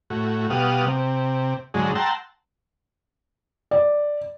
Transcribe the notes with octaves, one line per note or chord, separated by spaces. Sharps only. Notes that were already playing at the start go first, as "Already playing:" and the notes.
A2 F#4
B2 G3 F5 F#5 D#6
C3
G#2 D3 F#3 G#3
F#5 G5 A5 A#5 C6 E6
D5